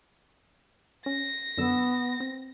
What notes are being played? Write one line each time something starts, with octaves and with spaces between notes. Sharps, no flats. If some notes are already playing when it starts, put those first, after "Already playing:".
C#4 A#6
F#2 D3 B3 E6
C4